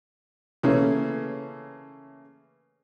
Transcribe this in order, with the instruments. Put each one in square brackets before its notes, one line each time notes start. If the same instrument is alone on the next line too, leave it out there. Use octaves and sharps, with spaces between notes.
[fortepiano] C#3 E3 A3 A#3 C#4